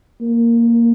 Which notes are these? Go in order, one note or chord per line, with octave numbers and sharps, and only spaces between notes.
A#3